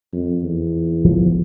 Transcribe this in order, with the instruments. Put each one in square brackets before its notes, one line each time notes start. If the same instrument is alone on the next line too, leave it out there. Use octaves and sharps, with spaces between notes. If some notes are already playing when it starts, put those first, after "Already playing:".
[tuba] F2
E2
[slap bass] F3